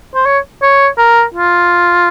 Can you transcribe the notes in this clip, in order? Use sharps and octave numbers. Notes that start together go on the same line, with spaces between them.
C5
C#5
C#5
A#4
F4